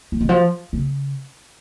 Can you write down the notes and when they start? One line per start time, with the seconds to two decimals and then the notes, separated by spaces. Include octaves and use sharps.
0.12 F3
0.21 D#3
0.29 F3
0.73 C#3